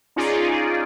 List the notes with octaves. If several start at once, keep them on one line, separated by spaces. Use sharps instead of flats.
C#4 D#4 F4 G#4 D5